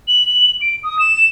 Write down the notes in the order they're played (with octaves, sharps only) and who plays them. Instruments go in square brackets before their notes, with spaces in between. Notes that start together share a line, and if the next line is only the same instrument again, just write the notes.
[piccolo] F#7
D7
D#6
E7